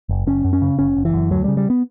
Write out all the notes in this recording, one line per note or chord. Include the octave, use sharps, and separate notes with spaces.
F#1
F#1 C#4
F#2
C#4
C#3
F#1 C#4
F#1
E3
F#2
D2 F#3
C#3 G3
G3
B3